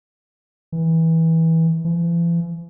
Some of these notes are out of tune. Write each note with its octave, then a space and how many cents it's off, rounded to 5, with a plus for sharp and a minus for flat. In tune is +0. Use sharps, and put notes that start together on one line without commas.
E3 -20
E3 +45